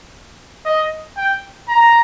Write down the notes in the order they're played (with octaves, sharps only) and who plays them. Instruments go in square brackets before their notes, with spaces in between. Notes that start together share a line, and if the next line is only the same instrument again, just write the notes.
[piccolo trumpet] D#5
G5
A#5